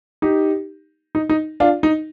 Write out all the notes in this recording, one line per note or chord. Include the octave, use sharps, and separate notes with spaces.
D#4 G4
D#4
D#4
D4 F4
D#4